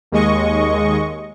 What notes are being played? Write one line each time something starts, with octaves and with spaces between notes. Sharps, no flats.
D#2 G#3 D#5 C#6